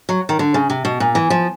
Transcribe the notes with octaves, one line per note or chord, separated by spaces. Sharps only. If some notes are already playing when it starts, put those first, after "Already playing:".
F#3
D#3
D3
C#3
C3
B2
A#2
E3
F3